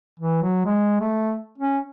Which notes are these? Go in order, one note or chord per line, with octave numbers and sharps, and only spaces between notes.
E3
F#3
G#3
A3
C#4